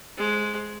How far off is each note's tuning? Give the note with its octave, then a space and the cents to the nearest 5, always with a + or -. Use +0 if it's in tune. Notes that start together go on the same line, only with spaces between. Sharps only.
G#3 +15 C5 +10